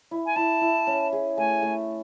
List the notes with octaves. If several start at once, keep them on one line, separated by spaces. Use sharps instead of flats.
E4
G#5
E4 A5
E4
C#4
G#4
A3 G#5
A3